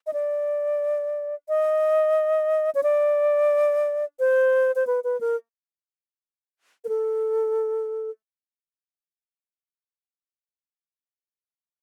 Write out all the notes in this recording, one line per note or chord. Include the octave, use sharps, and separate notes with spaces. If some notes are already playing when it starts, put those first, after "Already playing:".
D#5
D5
D#5
C#5
D5
C5
C5
B4
B4
A#4
A#4
A4